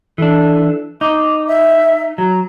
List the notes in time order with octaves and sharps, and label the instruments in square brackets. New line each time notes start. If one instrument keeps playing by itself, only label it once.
[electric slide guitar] E3 D4 [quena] A4
[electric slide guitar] D#4 [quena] D6
[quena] E5
[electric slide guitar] F#3 [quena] A#5